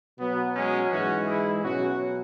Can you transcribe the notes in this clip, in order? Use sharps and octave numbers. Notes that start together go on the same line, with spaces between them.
B2 F#3 B3
G#3 C#4
G#2 E3 G#3 C#4 F#4
E4 G#4
B2 F#3 C#4 F#4